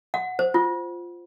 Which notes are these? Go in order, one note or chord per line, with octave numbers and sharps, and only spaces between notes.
F#5
C5
F4